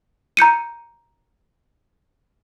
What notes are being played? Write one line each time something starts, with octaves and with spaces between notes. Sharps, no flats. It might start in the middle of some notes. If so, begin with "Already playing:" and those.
A#5 G6 C#7 D#7